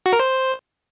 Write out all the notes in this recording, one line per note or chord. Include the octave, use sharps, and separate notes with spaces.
F#4
A#4
C5